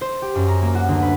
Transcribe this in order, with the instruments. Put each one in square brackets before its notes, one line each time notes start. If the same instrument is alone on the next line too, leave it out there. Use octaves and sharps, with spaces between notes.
[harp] C5
G4
F#2
A#5
A#3
F#4
D2
B4